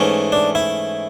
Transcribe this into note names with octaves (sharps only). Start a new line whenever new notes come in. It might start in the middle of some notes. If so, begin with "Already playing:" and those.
Already playing: G#2 E3 A3 C#4
D4
E4